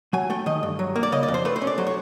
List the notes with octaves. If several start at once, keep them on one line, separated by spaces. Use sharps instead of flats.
F#3 G#5
A3 G5
D#3 D#5
G2
F#3
A#3
D5
C#3 D#5
D5
F2
C5
A3 B4
C5
C#4
D5
F#3 C5
C#5